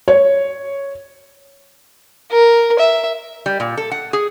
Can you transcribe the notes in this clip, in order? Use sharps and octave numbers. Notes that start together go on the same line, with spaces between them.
C#5
A#4
E5
G3
A#2
A4
F#5
G#4